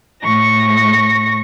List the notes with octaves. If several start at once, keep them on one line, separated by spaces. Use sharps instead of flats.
A2 C#6 A#6